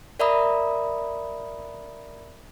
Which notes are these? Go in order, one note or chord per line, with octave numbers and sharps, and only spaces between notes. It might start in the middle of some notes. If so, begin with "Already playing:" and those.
A#4 D5 E5 A#5 B5 D#6